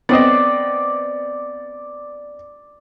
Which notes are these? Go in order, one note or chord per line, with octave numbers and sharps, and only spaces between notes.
B3 C4 D5 D#5